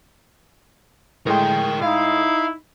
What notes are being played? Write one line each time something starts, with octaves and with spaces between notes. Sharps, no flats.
A2 G#3 A#4 G5 C6
D#4 E4 F5